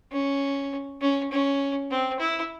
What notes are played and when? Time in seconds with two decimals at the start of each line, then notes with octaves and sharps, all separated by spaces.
0.12 C#4
1.01 C#4
1.31 C#4
1.90 C4
2.19 E4